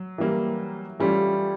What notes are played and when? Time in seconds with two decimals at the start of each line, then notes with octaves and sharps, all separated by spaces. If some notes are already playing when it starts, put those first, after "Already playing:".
Already playing: F#3
0.18 E3 G3 A#3
1.00 E3 G3 A3 C#4 F4